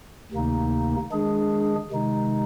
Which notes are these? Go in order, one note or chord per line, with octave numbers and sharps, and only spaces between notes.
D2 C3 D#3 A#3 D#4
D#3 G#3 D4 G#4
C3 D#3 G#3 D#4